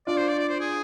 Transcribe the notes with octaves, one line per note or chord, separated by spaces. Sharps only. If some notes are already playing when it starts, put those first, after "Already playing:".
D4 F4 D5
C5
D5
D5
C5
G#4